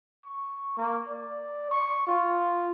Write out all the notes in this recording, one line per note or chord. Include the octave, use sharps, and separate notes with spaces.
C#6
A#3
D5
C#6
F4